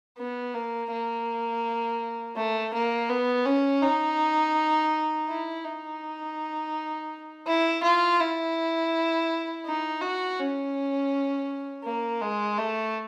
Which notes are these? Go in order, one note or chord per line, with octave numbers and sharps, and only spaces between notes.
B3
A#3
A#3
A3
A#3
B3
C#4
D#4
E4
D#4
E4
F4
E4
D#4
F#4
C#4
A#3
G#3
A3